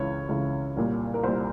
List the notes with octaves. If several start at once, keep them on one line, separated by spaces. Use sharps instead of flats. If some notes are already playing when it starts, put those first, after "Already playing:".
Already playing: C#2 C#3 E3 C#5
C#2 C#3 E3
C2 A#2 G3
A#4
C2 A#2 G3 C5